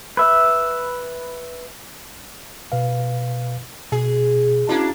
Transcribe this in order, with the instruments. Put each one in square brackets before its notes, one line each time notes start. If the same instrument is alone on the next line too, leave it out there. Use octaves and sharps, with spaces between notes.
[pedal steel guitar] B4 E5
[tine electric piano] B2 B4 F5
[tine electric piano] B2 [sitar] G#4
[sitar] A#3 D4 [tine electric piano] C#4 E4 F#4